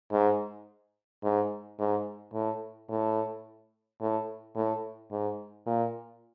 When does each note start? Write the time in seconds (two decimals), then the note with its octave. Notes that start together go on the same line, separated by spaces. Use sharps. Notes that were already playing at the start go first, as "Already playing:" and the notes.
0.12 G#2
1.23 G#2
1.79 G#2
2.34 A2
2.89 A2
4.01 A2
4.55 A2
5.11 G#2
5.66 A#2